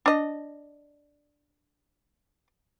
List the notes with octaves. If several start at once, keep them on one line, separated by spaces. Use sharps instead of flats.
D4 D#5